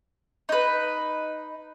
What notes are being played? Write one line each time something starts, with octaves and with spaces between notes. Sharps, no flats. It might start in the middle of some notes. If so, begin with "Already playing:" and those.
D#4 B4